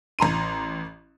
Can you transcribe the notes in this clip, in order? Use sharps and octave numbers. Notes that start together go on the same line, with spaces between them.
A1 A#5 C6 D#7